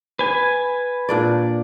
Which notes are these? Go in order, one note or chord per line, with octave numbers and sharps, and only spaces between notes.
B4 G#5
A#2 D4 D5